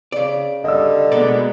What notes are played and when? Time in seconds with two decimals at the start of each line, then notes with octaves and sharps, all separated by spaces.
0.12 C#3 D5
0.64 D3 G3 D#5 E6
1.12 B2 G#3 A#3 B3 A4 D5